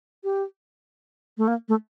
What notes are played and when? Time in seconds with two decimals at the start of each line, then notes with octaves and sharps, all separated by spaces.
0.24 G4
1.38 A3
1.48 A#3
1.69 A3